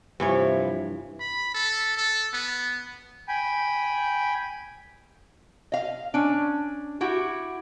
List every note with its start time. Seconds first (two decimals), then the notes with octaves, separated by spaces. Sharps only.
0.20 G2 C3 E3 F3 C#5
1.20 B5
1.55 A4
1.97 A4
2.33 B3
3.28 G5 G#5 B5
5.72 D#5 F5
6.14 C#4 D4
7.01 E4 F#4 G4